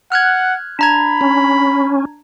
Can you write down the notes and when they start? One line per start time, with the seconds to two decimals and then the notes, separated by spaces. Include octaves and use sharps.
0.12 F#5 F6 F#6 G#6
0.79 D4 A#5 B5 G#6
1.21 C#4